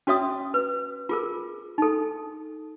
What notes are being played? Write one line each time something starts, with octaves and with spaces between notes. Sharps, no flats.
C#4 F#4 C#5 E5 D#6
B4
F4 G#4 A#4
D#4 A4